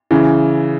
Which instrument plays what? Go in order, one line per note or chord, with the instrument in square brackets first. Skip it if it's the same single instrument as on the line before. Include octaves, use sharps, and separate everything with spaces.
[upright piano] C#3 E3